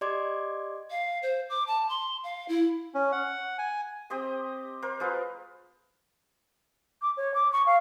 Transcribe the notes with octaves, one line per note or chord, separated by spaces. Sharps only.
G4 D5 D#5 C6 D6 G#6
F5
C5
D6
A5
C6
F5
E4
C#4
F#5
G#5
C4 G4 D#5 C6
A#4 C5
G#3 F4 B4
D6
C#5
D6
C#6
F5